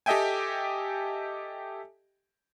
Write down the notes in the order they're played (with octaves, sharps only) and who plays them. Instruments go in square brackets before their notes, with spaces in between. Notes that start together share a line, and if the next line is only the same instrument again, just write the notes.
[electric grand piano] G4 A4 D#5 E5 G5 G#5